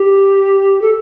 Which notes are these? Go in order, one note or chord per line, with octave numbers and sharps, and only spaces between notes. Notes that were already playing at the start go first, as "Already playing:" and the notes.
Already playing: G4
A4